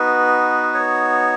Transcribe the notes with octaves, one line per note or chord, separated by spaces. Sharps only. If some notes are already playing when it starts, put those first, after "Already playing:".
Already playing: B3 D#4 F#4 B4
C#5